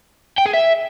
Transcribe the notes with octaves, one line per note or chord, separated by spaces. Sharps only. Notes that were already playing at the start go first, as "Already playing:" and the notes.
G5
G#4
E5